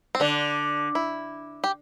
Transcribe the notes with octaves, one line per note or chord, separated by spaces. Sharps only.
C4
D3 D4
E4
G4